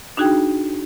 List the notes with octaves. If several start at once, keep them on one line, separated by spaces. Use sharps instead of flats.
D4 D#4 F#4 G#4 G5